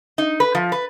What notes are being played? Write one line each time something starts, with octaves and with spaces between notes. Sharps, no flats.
D#4
B4
F3
B4